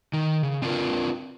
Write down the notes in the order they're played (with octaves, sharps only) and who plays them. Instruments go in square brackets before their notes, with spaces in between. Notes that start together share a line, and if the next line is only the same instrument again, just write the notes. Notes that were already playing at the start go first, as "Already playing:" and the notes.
[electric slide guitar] D#3
C#3
C4 D4 F4 A#4 B4